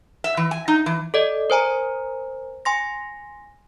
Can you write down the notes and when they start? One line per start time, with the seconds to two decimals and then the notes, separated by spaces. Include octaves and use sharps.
0.24 E5
0.37 E3
0.51 G#5
0.68 D#4
0.86 E3
1.14 A4 D5 D#5
1.50 A#4 C5 G#5 A#5
2.65 G#5 C6 A#6